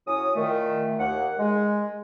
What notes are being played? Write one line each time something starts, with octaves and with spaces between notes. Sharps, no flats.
A2 F#3 C#4 D#6
A#2 D#3 A3
D#2 F#5
G#3